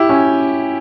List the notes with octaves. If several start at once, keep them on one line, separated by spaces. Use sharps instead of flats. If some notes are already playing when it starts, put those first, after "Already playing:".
Already playing: E4 G4
C#4